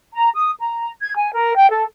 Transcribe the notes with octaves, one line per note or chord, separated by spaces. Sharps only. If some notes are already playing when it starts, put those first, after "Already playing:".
A#5
D#6
A#5
G#6
G#5
A#4
G5
A4